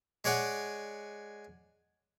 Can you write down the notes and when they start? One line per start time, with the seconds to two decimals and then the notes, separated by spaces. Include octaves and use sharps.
0.24 G#3 C#5 D5 F#5 G#5